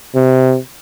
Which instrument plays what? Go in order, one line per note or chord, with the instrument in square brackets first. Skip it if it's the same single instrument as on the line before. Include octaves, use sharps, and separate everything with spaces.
[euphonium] C3